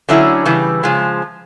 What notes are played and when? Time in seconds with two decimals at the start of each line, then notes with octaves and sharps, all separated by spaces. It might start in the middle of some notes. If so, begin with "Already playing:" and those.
0.09 D3 F#3 A3 C#4 E4
0.45 C#3 E3 G3
0.84 C#3 F3 G#3